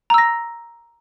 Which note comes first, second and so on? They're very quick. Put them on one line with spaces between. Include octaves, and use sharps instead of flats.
A#5 E6 A#6